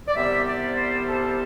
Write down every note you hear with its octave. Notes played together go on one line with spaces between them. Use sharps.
D5
C2 C3 G3 B3 E5
D5
C5
A4